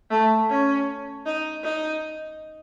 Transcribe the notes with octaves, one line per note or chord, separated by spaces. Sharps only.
A3
C#4
D#4
D#4